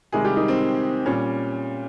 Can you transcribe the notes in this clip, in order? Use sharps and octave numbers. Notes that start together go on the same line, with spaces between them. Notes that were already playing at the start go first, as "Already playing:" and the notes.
C3 D#3 G3 G#3 G#4
G3 G4
D#3 D#4
C4
A#2 G3 C#4